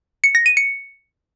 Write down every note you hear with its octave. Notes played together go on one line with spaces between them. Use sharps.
C#7
A#6
D#7
C#7